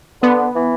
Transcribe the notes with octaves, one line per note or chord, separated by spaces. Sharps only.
D3 B3
E3